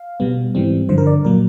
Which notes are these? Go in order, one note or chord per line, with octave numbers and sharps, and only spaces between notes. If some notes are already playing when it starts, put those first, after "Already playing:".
Already playing: F5
B2 G3 B3
G#2 E3 G3 C4
G2 D3 F3 C5
A#4
D5
A#2 F#3 A#3 A#4